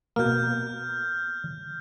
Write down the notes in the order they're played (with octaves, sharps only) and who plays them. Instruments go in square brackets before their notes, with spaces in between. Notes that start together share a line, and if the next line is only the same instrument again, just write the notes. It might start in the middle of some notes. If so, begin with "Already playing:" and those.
[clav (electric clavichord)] B2 A#3 [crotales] F6 G6